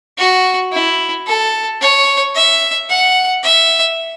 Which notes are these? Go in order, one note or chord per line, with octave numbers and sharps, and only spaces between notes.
F#4
E4
A4
C#5
E5
F#5
E5